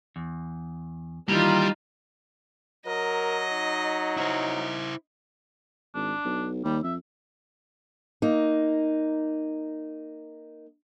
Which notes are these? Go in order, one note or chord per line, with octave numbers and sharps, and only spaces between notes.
E2
D#3 E3 G3 A#3 D#4 F4
F#3 A#4 D#5
D#4
E4 C5
G#1 D4
B1
D#2 G3
F2 E5
A#3 D#4